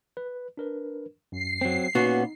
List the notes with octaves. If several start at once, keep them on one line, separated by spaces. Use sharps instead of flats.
B4
D4 A#4 B4
F#2 C7
F#3 C4
A#2 B3 C#4 D#4 F#4